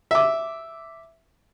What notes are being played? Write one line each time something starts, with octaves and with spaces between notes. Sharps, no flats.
E5 D6